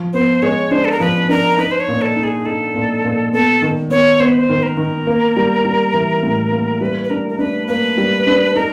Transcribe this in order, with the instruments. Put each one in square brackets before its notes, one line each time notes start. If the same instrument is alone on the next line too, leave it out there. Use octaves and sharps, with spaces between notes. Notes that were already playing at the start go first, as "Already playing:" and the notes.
Already playing: [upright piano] F3
[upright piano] B3 [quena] C5
[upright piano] G#3 [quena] C#5
[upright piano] D4 [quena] C5
[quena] A4
A#4
[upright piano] F3 [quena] B4
[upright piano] D4 [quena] A#4
[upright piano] D#4 [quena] B4
[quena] C5
C#5
[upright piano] A#2
[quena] A4
[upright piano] D#4
[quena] G#4
[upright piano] D#4 [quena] A4
[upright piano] A#2
A#2
[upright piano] B3 [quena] A4
[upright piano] D#3
[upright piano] B3 [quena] C#5
[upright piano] B3 [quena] C5
[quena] B4
C5
[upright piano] D#3
[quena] A#4
[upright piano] D#3
A#3
G3
G3
E3
A2
A#3
[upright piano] G3 [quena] B4
[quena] B4
[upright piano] D4 [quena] A#4
[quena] A#4
[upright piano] D4 [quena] B4
[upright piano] A#3 [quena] B4
[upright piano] G3
D4
[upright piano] D#4 [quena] A#4